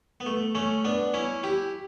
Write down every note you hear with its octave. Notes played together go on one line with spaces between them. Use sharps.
B3
A3
A3 C#4
B3 D4
C#4 E4
E4 G4